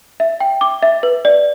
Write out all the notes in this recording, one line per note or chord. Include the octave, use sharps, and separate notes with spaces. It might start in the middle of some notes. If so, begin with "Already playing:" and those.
E5
G5
D6
E5
B4
D5